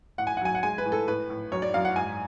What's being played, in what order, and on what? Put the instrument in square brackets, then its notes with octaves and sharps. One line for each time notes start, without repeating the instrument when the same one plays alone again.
[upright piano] A2 F#5
G#5
F#5
F#3 G#5
F#5
G#3 G#5
B4
A2
A4
A2 B4
A2
F#2 C#5
D5
F#2 F5
F#5
G#2 G#5